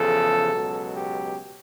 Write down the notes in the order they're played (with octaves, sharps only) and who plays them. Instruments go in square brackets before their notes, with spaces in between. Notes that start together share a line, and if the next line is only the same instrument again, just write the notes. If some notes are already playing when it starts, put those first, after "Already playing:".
Already playing: [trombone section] E2 C#3 F3 A4
C#2 B2 F#3
G4